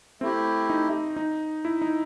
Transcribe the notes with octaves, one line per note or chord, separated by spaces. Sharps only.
A3 C4 E4 G4
D#4
D#4
E4
D#4